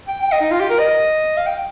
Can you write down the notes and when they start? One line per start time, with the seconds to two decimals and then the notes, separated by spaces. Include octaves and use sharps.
0.08 G5
0.22 G5
0.32 D#5
0.41 D#4
0.51 F4
0.61 G4
0.70 A#4
0.80 D#5
1.37 F5
1.47 G5